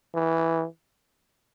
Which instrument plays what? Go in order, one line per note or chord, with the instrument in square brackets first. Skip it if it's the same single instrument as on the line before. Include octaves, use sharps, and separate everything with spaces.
[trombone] E3